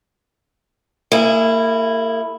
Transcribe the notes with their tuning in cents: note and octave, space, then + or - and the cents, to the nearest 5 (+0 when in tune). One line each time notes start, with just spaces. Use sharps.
A#3 -35 E4 +0 G#4 -20